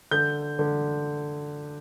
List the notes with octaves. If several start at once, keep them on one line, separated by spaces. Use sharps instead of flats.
D3 G6
D3